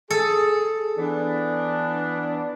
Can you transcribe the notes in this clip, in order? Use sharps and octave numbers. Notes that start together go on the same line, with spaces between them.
G#4 A4
E3 B3 D4